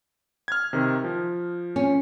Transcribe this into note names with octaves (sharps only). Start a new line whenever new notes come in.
F6 G#6
C3 D#3
F3
C#4